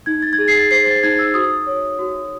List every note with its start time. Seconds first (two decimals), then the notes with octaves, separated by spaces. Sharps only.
0.06 D#4 G#6
0.22 A6
0.33 G#6
0.38 G#4 A6
0.48 C7
0.55 A6
0.71 C5 C7
0.86 A6
1.03 D#4 G#6
1.19 E6
1.34 F#4 D#6
1.67 C#5
1.99 F#4